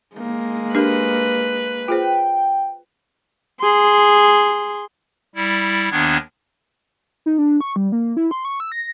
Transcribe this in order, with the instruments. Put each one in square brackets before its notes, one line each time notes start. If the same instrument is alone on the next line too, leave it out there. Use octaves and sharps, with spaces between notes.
[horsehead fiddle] G#3 A#3
[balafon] D4 G4 A#4 [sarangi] B4
[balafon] F4 G#4 C5 [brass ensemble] G5
[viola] G#4 C6
[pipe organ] G3 E4
D#2 D#3 B3 D4 G#6
[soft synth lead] D#4
D4
C#6
G3
A#3
E4
C6
C#6
E6
A#6